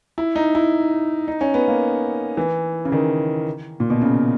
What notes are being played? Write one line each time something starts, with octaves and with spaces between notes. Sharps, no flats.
E4
D#4
E4
D#4
C#4
B3
A#3
E3
C#3
D#3
A#2
B2
C#3